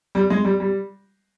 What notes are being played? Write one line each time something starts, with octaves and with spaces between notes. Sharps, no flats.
G3
G#3
G3
G3